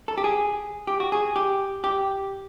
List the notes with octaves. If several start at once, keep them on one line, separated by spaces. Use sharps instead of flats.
A4
G4
G#4
G4
F#4
G#4
G4
G4